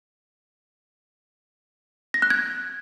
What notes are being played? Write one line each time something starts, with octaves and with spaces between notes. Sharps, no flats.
A#6
F#6
G#6